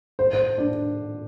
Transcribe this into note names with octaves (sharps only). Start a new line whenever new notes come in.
C5
C5
D4